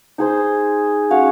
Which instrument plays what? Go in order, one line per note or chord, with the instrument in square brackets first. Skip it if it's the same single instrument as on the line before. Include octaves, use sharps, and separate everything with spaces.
[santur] D#4 G#4 C5
C#4 F#4 C#5 F5